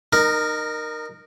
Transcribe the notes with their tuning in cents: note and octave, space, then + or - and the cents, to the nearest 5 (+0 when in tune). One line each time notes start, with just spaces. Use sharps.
D#4 -25 A#4 +0